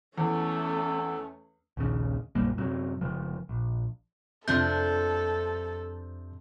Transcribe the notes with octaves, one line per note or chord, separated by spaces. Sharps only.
E2 A3 C#4 A4
A#1 D#2 C#3
A#1 F#2 G3 A#3
F#2 C3 F#3
F#1 C#3 F3
A#1
F2 C3 F3 D4 A4 G6